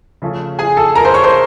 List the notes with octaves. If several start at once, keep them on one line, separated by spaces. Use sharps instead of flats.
C#3 F3 A3 C#4
G#4 G#5
A4 A5
A#4 A#5
C5 C6
C#5 C#6
C5 C6